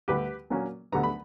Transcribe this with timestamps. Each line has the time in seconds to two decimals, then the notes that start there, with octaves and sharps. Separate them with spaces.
0.08 D2 D3 G3 G4 B4
0.50 A#2 F#3 A#3 C#4
0.92 D2 D3 G3 B3 A#5
1.03 B5